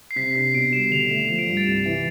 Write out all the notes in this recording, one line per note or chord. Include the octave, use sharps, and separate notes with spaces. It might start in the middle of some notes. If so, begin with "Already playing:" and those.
C7
C3 B6
D4 C7
B2 D7
G3 E7
D3 F7
A3 F7
F3 E7
D7
G2
A6
C2
E3